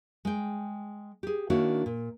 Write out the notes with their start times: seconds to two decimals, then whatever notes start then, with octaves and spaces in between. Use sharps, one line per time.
0.25 G#3 G5
1.23 G4 G#4
1.50 D#3 A#3 D4 E4 F#4 C#5
1.86 A#2